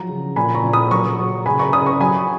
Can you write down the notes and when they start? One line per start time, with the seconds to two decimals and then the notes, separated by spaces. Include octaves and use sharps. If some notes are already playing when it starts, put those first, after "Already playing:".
Already playing: F3 F#3 A#5
0.09 C#3
0.36 A#2 G#5 B5
0.55 A#5 C#6
0.64 A#2
0.73 B5 D#6
0.91 F#3 A#5 C#6
1.19 F#3
1.46 C#3 G#5 B5
1.59 A#5 C#6
1.73 C#3 B5 D#6
1.86 A#5 C#6
2.00 F#3 G#5 B5